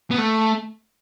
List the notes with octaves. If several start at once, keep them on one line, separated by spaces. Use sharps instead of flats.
B3
A3